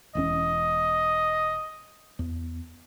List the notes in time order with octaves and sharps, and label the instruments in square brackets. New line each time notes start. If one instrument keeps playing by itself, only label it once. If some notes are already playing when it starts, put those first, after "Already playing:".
[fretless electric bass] E1 E2 C#4 [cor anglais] D#5
[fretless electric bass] E2